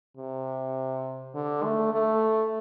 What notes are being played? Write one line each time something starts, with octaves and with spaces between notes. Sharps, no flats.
C3
D3
A3
A3